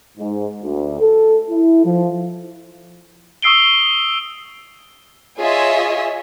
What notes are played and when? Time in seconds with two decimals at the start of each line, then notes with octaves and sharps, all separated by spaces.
0.17 G#2
0.62 D2
1.00 A4
1.49 E4
1.84 F3
3.42 C#6 D#6 E6 C7 D7 G7
5.37 F4 G#4 C#5 D#5 E5